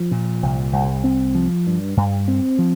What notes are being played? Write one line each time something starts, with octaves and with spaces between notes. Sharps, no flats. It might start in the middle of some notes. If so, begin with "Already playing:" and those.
Already playing: F3
A#2
C2
C2
C4
F3
G2
G2
C4
F3